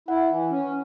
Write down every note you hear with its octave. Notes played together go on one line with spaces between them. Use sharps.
E4 F#5
E3
C#4